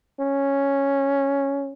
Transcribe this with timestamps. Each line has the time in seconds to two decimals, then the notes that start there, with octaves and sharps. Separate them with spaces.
0.20 C#4